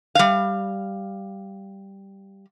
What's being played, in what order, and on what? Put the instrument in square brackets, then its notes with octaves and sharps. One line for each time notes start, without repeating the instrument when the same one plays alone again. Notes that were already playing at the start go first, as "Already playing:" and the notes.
[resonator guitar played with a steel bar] G3 F5